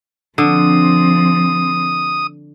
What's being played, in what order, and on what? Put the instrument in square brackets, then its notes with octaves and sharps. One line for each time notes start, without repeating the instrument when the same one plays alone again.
[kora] D3 [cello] F3 C4 [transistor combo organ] D#6